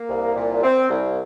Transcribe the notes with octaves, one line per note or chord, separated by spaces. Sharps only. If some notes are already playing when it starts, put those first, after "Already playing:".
Already playing: A#3
C2
A#2
C4
C2